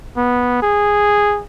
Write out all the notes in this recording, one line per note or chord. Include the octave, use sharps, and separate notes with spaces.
B3
G#4